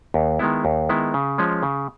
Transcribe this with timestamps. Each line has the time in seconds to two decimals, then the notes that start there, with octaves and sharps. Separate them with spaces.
0.14 D#2
0.39 D#3 G#3 B3 E4
0.65 D#2
0.89 D#3 G#3 B3 E4
1.14 C#3
1.38 F3 G#3 C#4
1.63 C#3